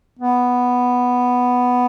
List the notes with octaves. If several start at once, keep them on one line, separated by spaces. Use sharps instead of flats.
B3